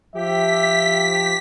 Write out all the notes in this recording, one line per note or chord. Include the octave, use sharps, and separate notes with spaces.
F3 G4 E5 B6